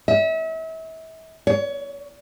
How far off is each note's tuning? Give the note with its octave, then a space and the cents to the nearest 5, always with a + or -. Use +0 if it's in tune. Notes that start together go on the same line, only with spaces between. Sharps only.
E5 -35
C#5 +25